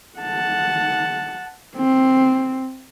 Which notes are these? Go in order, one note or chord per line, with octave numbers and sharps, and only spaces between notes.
F#5 A5
C4